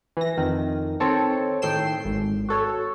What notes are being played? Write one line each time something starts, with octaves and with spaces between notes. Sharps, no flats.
E3 A#6
F2 D#3
D#3 C4 A4 C#5
A2 D#3 A4 G5 C7 E7
G#1
F#4 A4 C#5